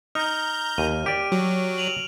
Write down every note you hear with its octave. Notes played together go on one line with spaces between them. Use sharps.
D#4 A#5 F6 G6
D#2 D#7
G4 D5 D7
F#3
D#7 F7 F#7